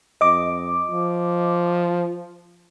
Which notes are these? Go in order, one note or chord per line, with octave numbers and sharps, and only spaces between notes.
F2 D#5 D6
F3